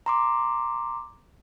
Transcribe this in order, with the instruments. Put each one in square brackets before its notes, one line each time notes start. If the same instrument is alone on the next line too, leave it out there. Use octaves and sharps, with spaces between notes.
[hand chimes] A#5 C6 D6